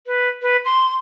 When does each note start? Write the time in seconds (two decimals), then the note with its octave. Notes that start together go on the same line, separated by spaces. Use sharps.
0.07 B4
0.42 B4
0.65 C6